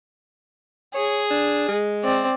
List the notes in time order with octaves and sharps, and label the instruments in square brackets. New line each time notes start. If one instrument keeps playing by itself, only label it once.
[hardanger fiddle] G#4 [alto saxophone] C#5
[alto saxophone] D4
G#3
[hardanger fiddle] C4 D5